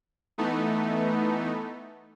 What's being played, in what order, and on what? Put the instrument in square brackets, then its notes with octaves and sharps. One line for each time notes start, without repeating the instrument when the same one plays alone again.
[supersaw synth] E3 A3 B3 D#4